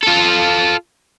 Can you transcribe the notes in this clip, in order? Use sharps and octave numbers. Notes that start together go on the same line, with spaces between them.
F4 A4